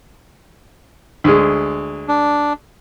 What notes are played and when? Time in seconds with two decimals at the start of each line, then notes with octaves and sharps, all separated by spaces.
1.24 D2 G#3
2.08 D4